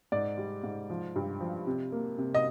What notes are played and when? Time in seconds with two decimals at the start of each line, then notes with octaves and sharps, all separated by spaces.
0.12 G#2 D5
0.38 G3
0.64 G#2
0.90 F3
1.16 G2
1.41 F3
1.67 C3
1.92 A#3
2.18 C3
2.34 D#5